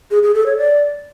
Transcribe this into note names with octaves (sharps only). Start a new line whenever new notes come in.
G#4
G#4
A4
C#5
D5